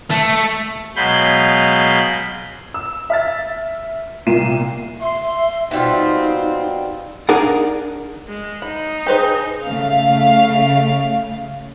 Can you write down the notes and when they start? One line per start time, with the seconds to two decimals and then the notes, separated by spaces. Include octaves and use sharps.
0.11 A3
0.96 B2 F#3 G#3 F5 B5 G6
2.74 E6
3.10 E5 F6 A6
4.27 C2 A#2 F4 C7 D#7 E7
5.00 E5 C6
5.71 B2 G3 C4 D#4 F4
7.29 D4 D#4 G#4 A#4 D5 F#5
8.27 G#3
8.62 D#4 B5
9.06 G4 G#4 B4 C5
9.66 C#3 A3 F5